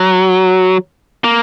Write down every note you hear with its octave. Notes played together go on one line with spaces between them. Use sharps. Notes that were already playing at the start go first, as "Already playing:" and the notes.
Already playing: F#3
A#3